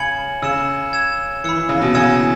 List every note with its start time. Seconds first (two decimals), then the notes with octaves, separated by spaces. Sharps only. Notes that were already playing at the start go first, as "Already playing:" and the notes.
Already playing: C#3 G#5 B5 G#6 C#7 F#7
0.42 C#3 E6 C#7 E7
0.93 E6 G#6 E7
1.44 E3 B5 E6 C#7
1.56 E3
1.69 C#3
1.82 B2
1.94 C#3 G#5 E6 G#6 C#7 E7
2.12 E3